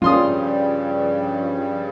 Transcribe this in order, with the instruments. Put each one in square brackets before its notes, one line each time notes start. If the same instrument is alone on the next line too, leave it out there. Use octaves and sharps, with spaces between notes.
[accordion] G2 C#3 G3 [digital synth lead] F3 [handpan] C#4 [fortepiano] F4 C6 D#6